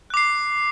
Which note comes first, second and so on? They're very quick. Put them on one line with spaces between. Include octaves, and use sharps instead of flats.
F#6 D6 C7